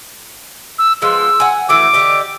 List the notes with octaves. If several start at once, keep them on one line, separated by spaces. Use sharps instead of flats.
E6
F3 G#3 B3 E6
F#5 G#5
E3 A3 F#4 D6
D3 G4 D#5